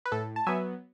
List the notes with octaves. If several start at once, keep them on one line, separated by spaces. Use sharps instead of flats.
B4
A2 A4
A5
F#3 B3 E5 G#5